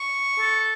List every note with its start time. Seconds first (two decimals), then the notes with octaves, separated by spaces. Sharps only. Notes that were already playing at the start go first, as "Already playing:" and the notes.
Already playing: C#6
0.39 A4